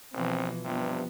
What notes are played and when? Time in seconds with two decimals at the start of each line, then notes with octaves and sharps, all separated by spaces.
0.14 A#1 B2 E3 F3 C4
0.65 G2 C3 F3 B3